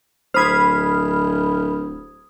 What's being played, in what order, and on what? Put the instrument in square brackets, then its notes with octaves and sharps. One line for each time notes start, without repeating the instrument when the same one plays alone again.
[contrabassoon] D1 [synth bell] C5 D#6 G#6 [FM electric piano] B5 F6